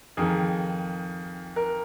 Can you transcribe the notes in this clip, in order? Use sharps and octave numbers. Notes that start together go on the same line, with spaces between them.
F2 D#3 G#4
A#4